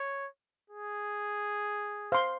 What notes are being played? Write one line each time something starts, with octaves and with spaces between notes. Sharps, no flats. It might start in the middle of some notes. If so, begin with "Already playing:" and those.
Already playing: C#5
G#4
C5 F5 C6